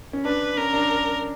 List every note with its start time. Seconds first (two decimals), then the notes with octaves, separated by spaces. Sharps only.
0.13 C#4
0.25 D4 B4
0.57 C#4 A#4
0.73 D4